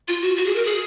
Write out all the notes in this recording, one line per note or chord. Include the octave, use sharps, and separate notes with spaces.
F4
F#4
F#4
G#4
A#4
G#4